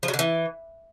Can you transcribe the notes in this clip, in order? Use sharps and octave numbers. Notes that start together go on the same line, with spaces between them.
F3
F#3
D3
E3